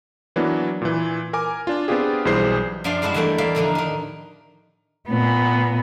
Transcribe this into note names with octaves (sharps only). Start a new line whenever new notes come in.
E3 F#3 A#3 B3 D4
A#2 E3
A#4 G#5 D6
D4 F4
B3 C4 D4 F4 G4 G#4
B1 E3 G3 G#4 C5 C7
F#2 F3 D4 F4 D5 C6
G2 G#3 E4 F#4 A5
E2 E3 G3 A3 A#3 G5
E2 A#3 D5 E5 F5
A2 D3 F3 D#4
D#3 D#4
A#2 B3